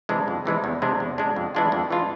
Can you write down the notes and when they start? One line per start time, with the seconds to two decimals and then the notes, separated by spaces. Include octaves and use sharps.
0.09 C3 E3 G#3 D4
0.28 F2
0.45 C3 E3 G#3 D4
0.64 E2
0.82 C3 G#3 D4
1.00 E2
1.18 C3 G#3 D4
1.36 F2
1.55 E3 G#3 D4 F4
1.72 F2
1.90 E3 G#3 D4 F4